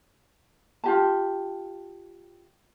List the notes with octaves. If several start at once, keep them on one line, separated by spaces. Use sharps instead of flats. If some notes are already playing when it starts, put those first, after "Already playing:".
F4 G4 A5